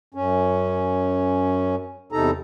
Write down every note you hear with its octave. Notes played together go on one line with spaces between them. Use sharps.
F#2 C#4
E2 C3 D#4 A4 A#5